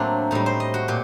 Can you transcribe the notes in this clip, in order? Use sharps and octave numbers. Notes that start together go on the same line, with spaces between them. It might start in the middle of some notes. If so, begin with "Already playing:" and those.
Already playing: A2 F#3 A3 A#3 C4 D4
A2 G3 D#4
C5
D#5
F#4
A#2 G4